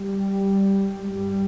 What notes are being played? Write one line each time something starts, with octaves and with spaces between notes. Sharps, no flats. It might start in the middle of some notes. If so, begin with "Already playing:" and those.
Already playing: G3
G2 G3